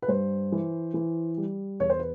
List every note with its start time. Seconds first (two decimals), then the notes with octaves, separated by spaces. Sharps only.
0.02 B4
0.08 G2 C5
0.52 E3
0.94 E3
1.37 G3
1.80 E2 C#5
1.90 C5
1.99 B4